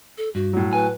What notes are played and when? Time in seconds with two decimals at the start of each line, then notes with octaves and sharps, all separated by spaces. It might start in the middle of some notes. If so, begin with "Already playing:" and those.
0.18 A4
0.35 G2 F#4
0.53 A2 F#3
0.73 B4 G#5